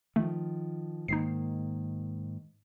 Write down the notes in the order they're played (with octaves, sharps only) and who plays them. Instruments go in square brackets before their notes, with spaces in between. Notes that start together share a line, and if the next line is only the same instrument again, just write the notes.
[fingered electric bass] D#3 F3 [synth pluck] A3
[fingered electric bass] G#2 D#3 A#3 [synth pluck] D#4 C7